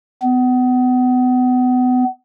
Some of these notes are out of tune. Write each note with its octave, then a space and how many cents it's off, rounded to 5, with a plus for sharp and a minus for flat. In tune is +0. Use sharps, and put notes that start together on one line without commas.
B3 +30